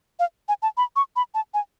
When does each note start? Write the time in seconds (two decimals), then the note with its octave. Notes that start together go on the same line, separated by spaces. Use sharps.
0.19 F5
0.48 G#5
0.62 A5
0.77 B5
0.96 C#6
1.16 B5
1.34 A5
1.54 G#5